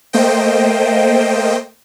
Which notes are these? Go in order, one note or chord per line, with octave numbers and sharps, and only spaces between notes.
A3 A#3 C5 D#5 G5